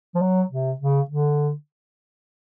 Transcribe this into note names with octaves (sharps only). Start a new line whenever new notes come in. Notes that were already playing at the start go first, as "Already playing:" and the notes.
F3
F#3
C3
C#3
D3